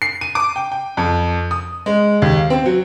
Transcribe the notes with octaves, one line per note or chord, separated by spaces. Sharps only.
C7
D#7
D6
G5
G5
F2
D#6
G#3
D#2
F5
C4
F#3